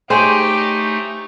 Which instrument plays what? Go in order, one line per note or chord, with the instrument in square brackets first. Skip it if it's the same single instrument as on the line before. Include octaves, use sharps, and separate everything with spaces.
[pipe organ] A3 D#4 [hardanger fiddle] G4 [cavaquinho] G#4 C#5 D#5 [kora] C5